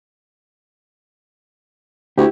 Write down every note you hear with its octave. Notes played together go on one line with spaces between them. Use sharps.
D2 E4 G4